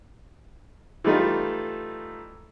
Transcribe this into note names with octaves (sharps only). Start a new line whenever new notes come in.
E3 G3 A3 D#4 F4